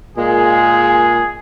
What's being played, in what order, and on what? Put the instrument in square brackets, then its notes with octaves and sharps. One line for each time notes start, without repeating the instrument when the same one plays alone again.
[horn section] A#2 G#3 [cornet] G#4